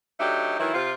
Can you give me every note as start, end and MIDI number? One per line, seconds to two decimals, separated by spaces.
0.20 0.58 54
0.20 0.58 57
0.20 0.58 62
0.20 0.58 63
0.20 0.58 67
0.59 0.72 51
0.59 0.72 52
0.59 0.72 54
0.59 0.72 64
0.74 0.94 48
0.74 0.94 65